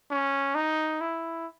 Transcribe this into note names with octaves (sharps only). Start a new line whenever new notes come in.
C#4
D#4
E4